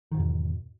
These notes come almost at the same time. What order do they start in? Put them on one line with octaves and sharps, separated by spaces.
D#3 G#2 E2 B2